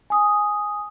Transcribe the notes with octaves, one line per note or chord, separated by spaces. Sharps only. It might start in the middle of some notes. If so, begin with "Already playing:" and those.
G#5 D#6